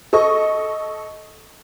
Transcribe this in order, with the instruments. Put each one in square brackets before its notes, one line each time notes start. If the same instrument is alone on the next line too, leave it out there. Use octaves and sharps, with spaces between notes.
[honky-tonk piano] A4 D#5 C#6